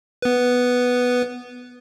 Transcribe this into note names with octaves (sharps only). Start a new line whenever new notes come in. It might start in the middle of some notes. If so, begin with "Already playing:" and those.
B3 B4